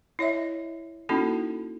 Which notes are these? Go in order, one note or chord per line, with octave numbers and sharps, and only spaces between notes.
E4 C#5 D#5 E5
A#3 C#4 D#4 E4 F#4 A4